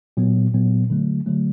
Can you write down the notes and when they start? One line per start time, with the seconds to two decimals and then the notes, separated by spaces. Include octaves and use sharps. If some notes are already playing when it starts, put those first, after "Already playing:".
0.17 A#2 F#3 B3
0.53 A#2 F#3 B3
0.90 D3 F#3 A3
1.26 D3 F#3 A3